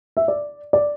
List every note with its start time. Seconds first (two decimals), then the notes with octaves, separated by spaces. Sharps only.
0.17 E5
0.28 D5
0.73 D5